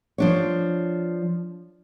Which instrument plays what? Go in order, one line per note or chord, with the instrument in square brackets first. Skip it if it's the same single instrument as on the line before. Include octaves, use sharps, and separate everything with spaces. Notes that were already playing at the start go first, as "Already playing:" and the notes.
[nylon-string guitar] F3 D4 C#5